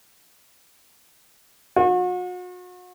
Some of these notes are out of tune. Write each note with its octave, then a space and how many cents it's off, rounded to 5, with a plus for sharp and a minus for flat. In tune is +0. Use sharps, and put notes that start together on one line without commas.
F#4 -40